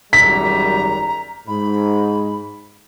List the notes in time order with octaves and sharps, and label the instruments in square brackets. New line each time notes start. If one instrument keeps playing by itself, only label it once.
[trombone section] G#1 F#2 G3 [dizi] A#5 [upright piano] B6
[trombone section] G#2 [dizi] B5